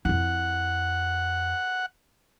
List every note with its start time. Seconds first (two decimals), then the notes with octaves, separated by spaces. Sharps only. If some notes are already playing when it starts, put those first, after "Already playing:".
0.05 F2 E4 F#5